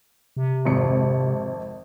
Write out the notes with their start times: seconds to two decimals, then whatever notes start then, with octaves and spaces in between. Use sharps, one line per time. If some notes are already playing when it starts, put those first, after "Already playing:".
0.37 C3
0.65 G#1 F2 C#7